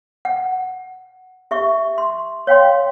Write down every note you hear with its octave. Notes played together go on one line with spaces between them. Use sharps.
F#5
G4 E5 C#6
C6
C#5 F5 G5 C6